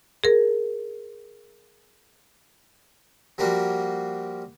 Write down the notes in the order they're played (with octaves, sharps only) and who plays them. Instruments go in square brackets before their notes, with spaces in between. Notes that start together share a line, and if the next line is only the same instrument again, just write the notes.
[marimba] G#4 A#4
[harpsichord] F3 G3 A#3 F#4